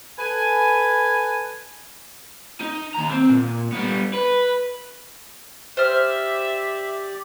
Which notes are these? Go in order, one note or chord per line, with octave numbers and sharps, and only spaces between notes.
A4 B4 G#5
D#4
D#2 A#5
C4
A#2
G3 B3
B4
G4 C5 D5 E5 F6